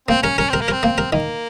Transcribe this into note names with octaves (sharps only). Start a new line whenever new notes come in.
A#3 C4
C#4 A#4
C#4 A#4
C4 A#4
A#3
C4 A#4
A#3
A#4
D#3 A#3